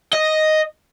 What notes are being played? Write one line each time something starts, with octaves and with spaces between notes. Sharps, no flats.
D#5